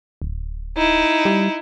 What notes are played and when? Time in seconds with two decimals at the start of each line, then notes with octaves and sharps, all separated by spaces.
0.22 D1
0.77 D#4 E4
1.25 G3